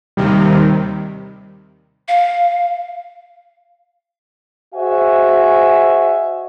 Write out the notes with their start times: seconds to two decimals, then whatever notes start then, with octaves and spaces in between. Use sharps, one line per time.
0.17 D#2 C3 D#3 G3
2.08 F5
4.74 F#4 G#4 C5 D#5 E5 G#5